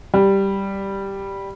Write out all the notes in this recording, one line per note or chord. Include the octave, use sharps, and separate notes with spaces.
G3